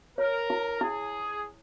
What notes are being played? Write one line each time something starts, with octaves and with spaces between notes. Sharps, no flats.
A#4 C#5
E4
E4 G#4